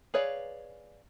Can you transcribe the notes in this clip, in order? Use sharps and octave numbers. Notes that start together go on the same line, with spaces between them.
G#4 B4 C#5 D5 F5